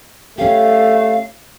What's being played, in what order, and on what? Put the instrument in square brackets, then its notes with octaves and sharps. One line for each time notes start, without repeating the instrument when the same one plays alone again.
[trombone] A3 [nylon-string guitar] C#4 G4 [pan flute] F5